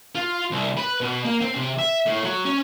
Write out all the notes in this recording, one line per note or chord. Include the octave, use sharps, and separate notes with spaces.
F4
C2
B4
B2
A#3
C4
C3
E5
A2
F#3
C#4